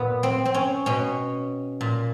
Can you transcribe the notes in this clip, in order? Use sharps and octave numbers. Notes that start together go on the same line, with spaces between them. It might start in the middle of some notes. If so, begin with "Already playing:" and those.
Already playing: A#2 B3
C4
C4
C#4
B2 C#4
A#2